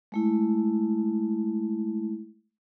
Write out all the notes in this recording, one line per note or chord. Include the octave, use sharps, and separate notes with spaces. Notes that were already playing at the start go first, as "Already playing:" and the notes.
G#3 A3 E4